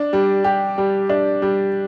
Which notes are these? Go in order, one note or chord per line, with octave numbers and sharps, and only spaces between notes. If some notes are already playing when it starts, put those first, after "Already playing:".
Already playing: D4
G3
G4
G3
D4
G3